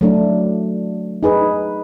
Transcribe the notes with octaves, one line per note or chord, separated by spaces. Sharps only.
F#3 A3 D4
D#4 G#4 B4